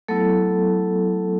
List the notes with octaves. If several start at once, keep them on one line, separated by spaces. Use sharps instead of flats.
F#3 A3 B3 E4 A4